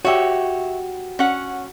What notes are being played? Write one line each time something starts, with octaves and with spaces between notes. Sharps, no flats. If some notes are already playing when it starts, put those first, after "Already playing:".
F#4 G4 C#5 E5
C#4 F#5